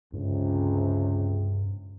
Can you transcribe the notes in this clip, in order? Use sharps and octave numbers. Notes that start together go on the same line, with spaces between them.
C#2 G2 C3